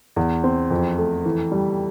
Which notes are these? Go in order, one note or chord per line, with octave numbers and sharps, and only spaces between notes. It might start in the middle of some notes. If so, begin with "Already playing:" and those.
E2
C4
F2
A3
E3
G3